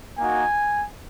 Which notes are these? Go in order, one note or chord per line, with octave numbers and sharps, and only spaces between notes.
A#3 D#4 F#4 G#5